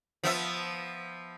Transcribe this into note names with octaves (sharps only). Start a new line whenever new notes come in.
F3 B3 E5